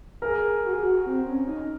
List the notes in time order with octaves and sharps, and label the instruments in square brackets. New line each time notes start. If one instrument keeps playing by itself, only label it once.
[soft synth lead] G#4 [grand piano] A#4
[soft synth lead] F#4
G#4
F#4
C4
C#4
D#4